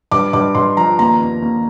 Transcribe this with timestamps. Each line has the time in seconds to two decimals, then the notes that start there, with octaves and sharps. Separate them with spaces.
0.12 G2 D6
0.33 G2 D6
0.55 G2 C6
0.77 F3 A#5
0.98 D#2 A#5
1.20 D#2
1.42 D#2